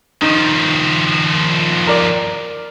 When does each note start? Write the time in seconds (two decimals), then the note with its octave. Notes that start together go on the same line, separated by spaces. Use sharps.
0.22 D#3 F3 D#4
1.87 A#4 D5